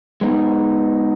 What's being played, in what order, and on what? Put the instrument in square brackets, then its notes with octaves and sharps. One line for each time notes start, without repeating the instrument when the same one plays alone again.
[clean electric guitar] G#3 B3 D#4